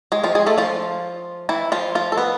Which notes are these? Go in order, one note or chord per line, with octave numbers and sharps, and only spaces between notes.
G#3 G#4
F3 F4
G#3 G#4
A3 A4
F3 F4
E3 E4
F3 F4
F3 F4
A4
B3 B4